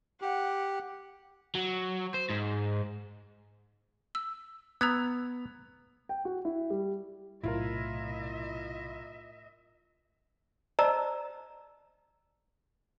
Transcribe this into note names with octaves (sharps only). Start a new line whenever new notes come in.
G4 F#5
F#3
C5
G#2
E6
B3 A#5 E6 G#6
G5
F#4
E4
G3
B1 A2 C3 E4 F4 A#4 D#5 E5
C5 D5 D#5 A5 A#5 E6